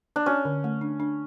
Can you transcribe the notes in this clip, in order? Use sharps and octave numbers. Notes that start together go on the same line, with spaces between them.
D4
C#4 F#4
D3
A3
D4
D4